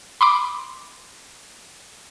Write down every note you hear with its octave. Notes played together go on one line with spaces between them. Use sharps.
B5 C6 D6